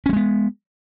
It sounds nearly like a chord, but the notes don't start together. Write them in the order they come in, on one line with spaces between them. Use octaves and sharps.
C#4 G3 G#3 B3